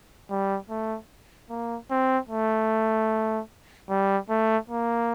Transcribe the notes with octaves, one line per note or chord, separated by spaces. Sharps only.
G3
A3
A#3
C4
A3
G3
A3
A#3